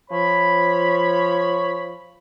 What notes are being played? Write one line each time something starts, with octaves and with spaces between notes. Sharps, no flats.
F3 C#5 B5